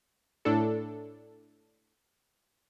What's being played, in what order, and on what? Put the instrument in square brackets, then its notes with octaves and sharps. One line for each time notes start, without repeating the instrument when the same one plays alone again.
[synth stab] A2 D4 A4